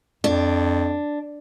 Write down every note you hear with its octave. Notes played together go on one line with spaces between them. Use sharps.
F2 D4